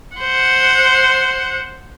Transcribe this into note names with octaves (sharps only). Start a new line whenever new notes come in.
C5 F#5